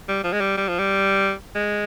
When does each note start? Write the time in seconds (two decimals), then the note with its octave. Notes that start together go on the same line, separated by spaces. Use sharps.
0.09 G3
0.24 F3
0.33 G#3
0.41 G3
0.57 G3
0.68 F3
0.79 G3
1.55 G#3